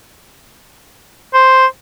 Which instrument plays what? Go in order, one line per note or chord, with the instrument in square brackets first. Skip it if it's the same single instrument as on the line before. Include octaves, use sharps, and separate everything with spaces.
[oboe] C5